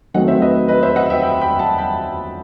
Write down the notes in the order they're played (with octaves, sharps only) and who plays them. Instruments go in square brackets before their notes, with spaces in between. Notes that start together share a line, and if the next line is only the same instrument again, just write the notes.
[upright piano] D#3 F#3 A3 C4 D#5 F#5
C5 E5
B4 D#5
B4 D#5
C5 E5
D#5 F#5
E5 G5
G5 B5
G5 B5
F#5 A5
G5 B5